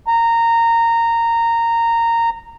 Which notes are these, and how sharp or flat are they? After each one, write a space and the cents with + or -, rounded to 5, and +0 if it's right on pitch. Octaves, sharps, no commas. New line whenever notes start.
A#5 -15